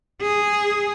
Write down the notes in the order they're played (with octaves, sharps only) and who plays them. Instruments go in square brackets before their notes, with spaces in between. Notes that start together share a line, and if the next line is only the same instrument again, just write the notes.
[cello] G#4